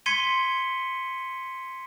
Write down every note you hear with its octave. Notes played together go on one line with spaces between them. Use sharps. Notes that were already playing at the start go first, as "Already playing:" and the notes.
C6 G#6 B6 C#7 D#7 G7